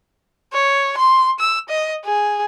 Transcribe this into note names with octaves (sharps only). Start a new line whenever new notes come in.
C#5
C6
E6
D#5
G#4